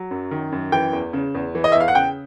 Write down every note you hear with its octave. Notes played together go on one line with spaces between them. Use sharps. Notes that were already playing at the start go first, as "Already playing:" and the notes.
Already playing: F#3
F#2
D#3
F#2
E3 G5
E2
C#3
E2
E3
D#5
E5
E2
F5
F#5
C#3 G5